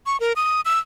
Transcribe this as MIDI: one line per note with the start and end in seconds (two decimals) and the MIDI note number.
0.06 0.20 85
0.20 0.33 70
0.36 0.61 87
0.65 0.79 88